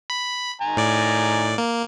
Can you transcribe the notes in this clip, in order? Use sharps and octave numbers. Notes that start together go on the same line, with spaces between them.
B5
D#3 G#5 A#5
A2 D5
A#3